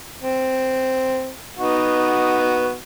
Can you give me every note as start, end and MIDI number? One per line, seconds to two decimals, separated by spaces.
0.23 1.32 60
1.58 2.76 59
1.58 2.76 63
1.58 2.76 66